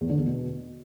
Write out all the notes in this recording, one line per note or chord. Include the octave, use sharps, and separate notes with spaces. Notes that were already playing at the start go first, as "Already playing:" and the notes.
E2
D3
E2
B2